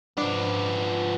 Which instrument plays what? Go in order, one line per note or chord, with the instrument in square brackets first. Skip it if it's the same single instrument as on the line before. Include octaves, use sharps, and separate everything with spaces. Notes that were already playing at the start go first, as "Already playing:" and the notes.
[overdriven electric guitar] F3 B3 [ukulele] D4